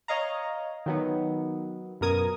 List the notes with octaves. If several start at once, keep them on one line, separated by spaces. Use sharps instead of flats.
C#5 D#5 F5 A#5
D#3 F#3 B3
F#2 B2 A#4 D#6 G#6